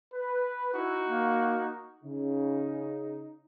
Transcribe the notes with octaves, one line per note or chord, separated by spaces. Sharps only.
B4
D#4 E4 F#4
A#3
C#3 D#4